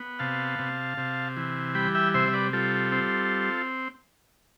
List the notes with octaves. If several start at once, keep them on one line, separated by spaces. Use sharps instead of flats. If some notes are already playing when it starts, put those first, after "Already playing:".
Already playing: B3
C3 F5 A5
C3
C3
E3
G3 G5 B5
E5 G5
C3 C5 E5
E5
B4 D5
G3 F4 A4
C4